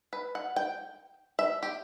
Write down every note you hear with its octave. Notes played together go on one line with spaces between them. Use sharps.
B4
F#5
G5
E5
G4